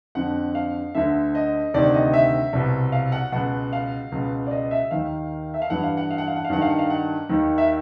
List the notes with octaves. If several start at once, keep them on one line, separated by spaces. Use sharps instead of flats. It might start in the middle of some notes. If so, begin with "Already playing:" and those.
F2 D3 F#5
F5
D2 D3 E5
D#5
D2 C3 D#3 D5
D#5
E5
C2 B2
F5
F#5
C#2 B2 F#5
F5
C#2 B2
D5
D#5
E5
D#2 D#3 F5
E5
F5
G2 E3 F#5
F5
F#5
F5
F#5
F5
F#5
F5
G2 D#3 F#5
F5
F#5
F5
F#5
D#2 D#3
E5